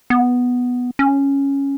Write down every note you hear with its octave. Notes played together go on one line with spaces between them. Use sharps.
B3
C#4